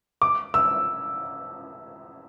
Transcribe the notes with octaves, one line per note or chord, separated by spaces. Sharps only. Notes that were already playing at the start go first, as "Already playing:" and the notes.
D6
E6